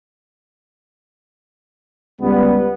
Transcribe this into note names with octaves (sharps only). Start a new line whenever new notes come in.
C#2 G3 B3